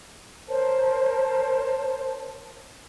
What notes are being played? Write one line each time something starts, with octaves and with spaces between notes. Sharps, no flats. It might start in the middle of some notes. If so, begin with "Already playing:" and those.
A#4 C5 C#5 A5